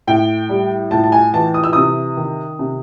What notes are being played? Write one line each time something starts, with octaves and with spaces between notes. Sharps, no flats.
A2 G5
G3
A2 A5
A5
G#5
E3 A5
D#6
E6
C3 D#6
D#3
C3